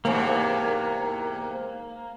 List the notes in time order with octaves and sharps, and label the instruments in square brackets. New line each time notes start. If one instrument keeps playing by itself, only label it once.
[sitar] E2 G#2 C3 [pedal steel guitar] A#3